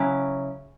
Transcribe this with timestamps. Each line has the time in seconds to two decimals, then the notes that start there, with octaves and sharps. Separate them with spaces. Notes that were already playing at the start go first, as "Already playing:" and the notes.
Already playing: C#3 F#3 C#4 E4